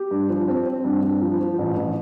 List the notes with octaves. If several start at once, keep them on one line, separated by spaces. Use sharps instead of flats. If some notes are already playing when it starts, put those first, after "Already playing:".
Already playing: G4
G2
F3
C4
C4
G2
G2
F3
F3
A1
A1